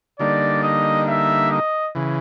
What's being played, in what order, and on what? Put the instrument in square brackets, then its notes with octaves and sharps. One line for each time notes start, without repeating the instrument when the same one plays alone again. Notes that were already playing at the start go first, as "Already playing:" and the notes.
[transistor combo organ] D3 G3 A#3 D#4 [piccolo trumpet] D5
[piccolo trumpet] D#5
E5
D#5
[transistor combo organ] C#3 E3